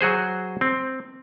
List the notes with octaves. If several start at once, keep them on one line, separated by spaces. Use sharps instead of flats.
F#3 F#4 G#4 C5
C4